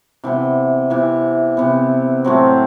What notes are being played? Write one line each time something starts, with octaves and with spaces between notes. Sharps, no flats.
C3 E3 B3
C3 E3 B3 E4
C3 E3 B3
A2 F#3 C4